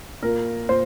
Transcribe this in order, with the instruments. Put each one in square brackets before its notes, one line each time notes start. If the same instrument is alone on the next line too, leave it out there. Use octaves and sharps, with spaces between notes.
[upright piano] A#2 A#4
A#2 C5